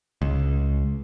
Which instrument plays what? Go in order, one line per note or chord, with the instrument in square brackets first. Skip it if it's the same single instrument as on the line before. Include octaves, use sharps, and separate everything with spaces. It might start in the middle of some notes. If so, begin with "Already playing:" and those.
[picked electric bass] C#2